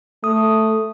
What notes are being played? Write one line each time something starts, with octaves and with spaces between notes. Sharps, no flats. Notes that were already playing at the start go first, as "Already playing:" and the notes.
A3 D#6